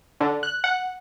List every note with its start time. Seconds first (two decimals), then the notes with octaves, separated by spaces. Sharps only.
0.20 D3
0.43 F#6
0.64 F#5